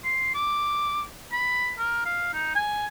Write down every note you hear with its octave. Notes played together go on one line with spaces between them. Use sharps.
C6
D6
B5
A#4
F5
D#4
G#5